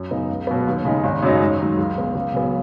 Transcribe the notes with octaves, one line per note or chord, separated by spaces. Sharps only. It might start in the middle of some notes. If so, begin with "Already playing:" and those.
Already playing: F#2
C#3 B3 D#4
C#2
B2 F#3 B3
D#2
C#3 G#3 D#4
G#1
F#2 C#3 F#3 D#4
G#2
D#3 F#3
C#2
C#3 B3
C#2
C#3 F#3 B3